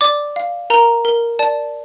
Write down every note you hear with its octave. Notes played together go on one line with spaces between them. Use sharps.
D5 D6
F5
A#4 A#5
A#4
D5 A5